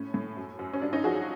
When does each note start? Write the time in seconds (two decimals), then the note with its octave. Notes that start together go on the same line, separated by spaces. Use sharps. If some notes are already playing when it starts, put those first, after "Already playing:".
Already playing: A2 C#4
0.14 A2
0.37 F#2
0.59 F#2
0.73 C#4
0.82 G2 D4
0.93 C#4 D#4
1.04 F3 F#4 G#4